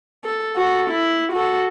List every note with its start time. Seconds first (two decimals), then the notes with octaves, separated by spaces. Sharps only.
0.24 A4
0.56 F#4 A4
0.90 E4
1.33 F#4 A4